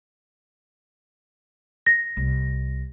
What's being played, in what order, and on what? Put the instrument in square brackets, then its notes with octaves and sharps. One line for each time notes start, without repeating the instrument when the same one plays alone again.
[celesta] A#6
[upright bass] C2